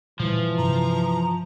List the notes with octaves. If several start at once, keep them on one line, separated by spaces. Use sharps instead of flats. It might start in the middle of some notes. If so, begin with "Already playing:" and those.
A#2 C#3 E3 F3 G3
G2 C3 A#5